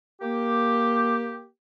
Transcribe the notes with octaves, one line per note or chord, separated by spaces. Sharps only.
A#3 G4